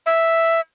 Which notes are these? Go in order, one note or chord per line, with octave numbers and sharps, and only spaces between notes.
E5